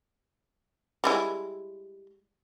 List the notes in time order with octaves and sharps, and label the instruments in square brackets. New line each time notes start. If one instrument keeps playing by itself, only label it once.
[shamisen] G3 G#3 E4